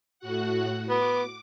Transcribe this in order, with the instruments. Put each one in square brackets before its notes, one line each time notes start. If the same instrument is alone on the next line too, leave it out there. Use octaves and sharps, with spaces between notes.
[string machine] A2 F#4 F#5
[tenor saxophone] B3 [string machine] D6